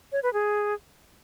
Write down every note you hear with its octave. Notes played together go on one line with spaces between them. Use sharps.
C#5
B4
G#4